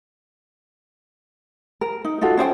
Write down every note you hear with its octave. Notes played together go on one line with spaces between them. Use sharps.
A#4
D#4
D#4 F4 F#4 A4
C#4 C5 D5 G5